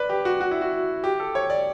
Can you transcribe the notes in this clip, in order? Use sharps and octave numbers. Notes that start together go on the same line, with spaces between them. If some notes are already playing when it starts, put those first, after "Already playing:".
Already playing: B4 D5
G4
F#4
F#4
E4
F#4
G4
A4
C#5
D5